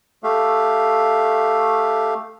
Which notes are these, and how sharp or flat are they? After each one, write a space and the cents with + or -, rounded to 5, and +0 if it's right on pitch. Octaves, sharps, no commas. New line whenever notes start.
A3 +0 G4 +0 F5 +0